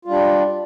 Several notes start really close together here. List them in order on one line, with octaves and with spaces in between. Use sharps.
F4 G3 D4